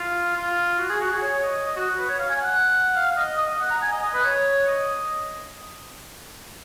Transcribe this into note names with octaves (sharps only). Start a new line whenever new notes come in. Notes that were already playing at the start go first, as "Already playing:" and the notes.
Already playing: F4
F4
F#4
G#4
F#4
G#4
C#5
D#5
D#5
F#4
B4
C#5
F5
G#5
F#5
F5
F5
D#5
D#5
D#5
F#5
A#5
G#5
D#5
D#5
B4
C#5
D#5